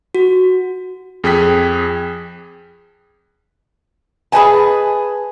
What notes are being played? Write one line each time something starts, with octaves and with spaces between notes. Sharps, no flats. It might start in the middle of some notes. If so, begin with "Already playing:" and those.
F#4
F2 G#4 G5 F#6 B6
G#4 B4 C5 D#5 G#5 A5